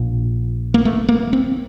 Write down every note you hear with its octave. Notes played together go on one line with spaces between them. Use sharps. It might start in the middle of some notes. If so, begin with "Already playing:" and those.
Already playing: A#1 A#2
A#3
A3
A#3
C4